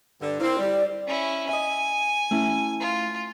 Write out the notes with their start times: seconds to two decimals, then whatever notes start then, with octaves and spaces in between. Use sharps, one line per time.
0.20 G2 D3
0.40 A#3 C4 E4
0.59 G3 D5
1.07 C#4 E4
1.49 D#5 E5 G#5
2.31 A3 C#4 E4
2.80 F4